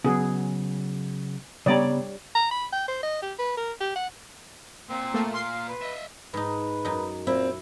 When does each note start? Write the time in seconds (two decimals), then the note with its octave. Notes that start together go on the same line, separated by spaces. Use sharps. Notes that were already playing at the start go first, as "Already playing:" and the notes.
0.05 C#3 F#3 B3 G#4
1.66 C#3 G3 B3 C#5 D5 A#5
2.35 A#5
2.51 B5
2.73 G5
2.88 C5
3.03 D#5
3.23 G4
3.39 B4
3.57 A#4
3.81 G4
3.96 F#5
4.90 A#2 C4
5.14 A3 A#3
5.34 F5 C6 C7
5.69 B4
5.81 D#5 E5
6.34 G#2 D#4 B4
6.85 F#2 D#4
7.27 A#2 C4 E4